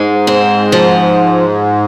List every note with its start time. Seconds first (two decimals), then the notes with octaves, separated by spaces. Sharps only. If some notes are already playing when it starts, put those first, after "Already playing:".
Already playing: G#2 G#3
0.27 C4
0.72 F3